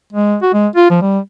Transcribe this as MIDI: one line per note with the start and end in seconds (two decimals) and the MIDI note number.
0.13 0.37 56
0.42 0.50 66
0.53 0.68 56
0.76 0.87 65
0.90 0.98 53
1.02 1.19 55